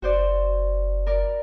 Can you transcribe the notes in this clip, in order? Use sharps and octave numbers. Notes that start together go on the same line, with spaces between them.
F#1 F#4 C5 D5
A#4 D5